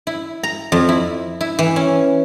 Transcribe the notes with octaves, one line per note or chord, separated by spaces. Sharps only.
E4
A#5
F2
E4
E4
E3
C#4